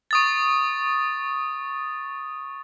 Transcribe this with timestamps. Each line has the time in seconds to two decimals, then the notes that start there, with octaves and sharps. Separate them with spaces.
0.11 C#6 D#6 A6